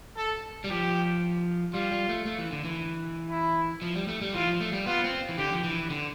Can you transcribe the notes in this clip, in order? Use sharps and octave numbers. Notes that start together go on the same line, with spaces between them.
A4
G3
F3 G4
G3 F4
G3
A3
A3
E3
D3
E3
E4
F3
G3
A3
G3
E3 F4
F3
A3
G3
B3 F4
C4
E3
D3 G4
F3
E3
D3